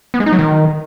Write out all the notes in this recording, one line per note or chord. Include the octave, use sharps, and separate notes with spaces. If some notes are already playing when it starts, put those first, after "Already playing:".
B3
G#3
D#4
F#3
D#3